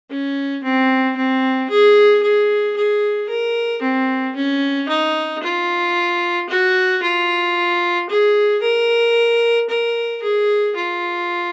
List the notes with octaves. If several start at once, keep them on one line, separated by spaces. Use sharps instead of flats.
C#4
C4
C4
G#4
G#4
G#4
A#4
C4
C#4
D#4
F4
F#4
F4
G#4
A#4
A#4
G#4
F4